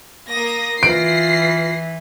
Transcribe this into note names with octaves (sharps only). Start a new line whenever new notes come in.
A#3 D#6 A#6
E3 F4 B4 A#6 C7 D7